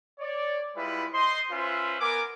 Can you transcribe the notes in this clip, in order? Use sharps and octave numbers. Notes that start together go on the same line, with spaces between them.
C#5 D5
G3 G#3 E4 F4 B4
C5 D#5 C6
C#4 F4 B4 C5 E5
B3 A#4 G#5 D6